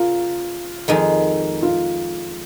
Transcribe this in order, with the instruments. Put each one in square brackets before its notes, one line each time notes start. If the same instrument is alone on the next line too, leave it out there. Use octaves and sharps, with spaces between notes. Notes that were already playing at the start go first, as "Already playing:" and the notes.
Already playing: [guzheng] C#3 A#3 [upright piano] F4
[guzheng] F2 D#3 G#3
[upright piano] F4